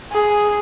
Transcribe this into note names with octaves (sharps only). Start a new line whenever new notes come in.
G#4